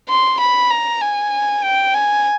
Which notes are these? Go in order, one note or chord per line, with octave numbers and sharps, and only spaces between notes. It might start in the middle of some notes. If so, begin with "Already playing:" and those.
C6
B5
A#5
G#5
G5
G#5